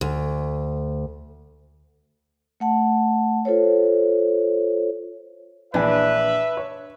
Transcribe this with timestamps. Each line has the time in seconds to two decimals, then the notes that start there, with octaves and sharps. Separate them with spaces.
0.01 D2
2.60 A3 F#5 A5
3.45 F4 A4 C5 C#5
5.74 A#1 E3 D4 B4 E5 G#5
6.57 C#5